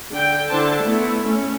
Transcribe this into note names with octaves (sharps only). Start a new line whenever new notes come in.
D3 G5
D3 D4 E4 A4 C5 A5
A3 B3 E4
A3 C#4